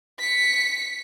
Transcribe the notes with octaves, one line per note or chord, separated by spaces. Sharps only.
B6 C#7